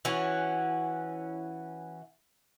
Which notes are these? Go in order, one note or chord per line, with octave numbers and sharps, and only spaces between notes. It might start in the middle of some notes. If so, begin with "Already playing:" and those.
E3 C#4 F#4